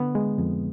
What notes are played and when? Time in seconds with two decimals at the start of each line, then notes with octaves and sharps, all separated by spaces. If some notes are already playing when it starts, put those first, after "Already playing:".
Already playing: D3 B3
0.15 G#3
0.38 F2